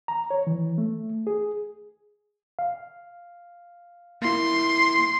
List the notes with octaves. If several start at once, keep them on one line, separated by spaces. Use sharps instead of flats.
A#5
C#5
E3
A3
G#4
F5
A#3 E4 C6